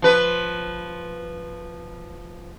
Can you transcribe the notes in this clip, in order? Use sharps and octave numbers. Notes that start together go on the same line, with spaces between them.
F3 B4